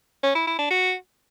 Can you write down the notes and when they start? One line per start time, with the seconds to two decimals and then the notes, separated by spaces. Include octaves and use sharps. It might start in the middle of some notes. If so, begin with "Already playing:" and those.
0.23 C#4
0.35 E4
0.47 E4
0.59 D4
0.71 F#4